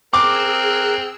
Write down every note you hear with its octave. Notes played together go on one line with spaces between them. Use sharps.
C4 G#4 A#4 D6 E6 F#6